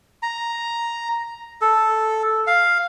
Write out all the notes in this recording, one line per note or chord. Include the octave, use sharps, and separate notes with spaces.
A#5
A4
F5